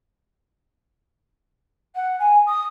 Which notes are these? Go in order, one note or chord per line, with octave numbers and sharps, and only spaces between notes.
F#5
G#5
D#6